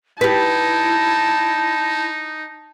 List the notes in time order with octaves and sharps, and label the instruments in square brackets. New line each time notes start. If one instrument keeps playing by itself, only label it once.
[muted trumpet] D#4 [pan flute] E4 [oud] G4 B4 [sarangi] A5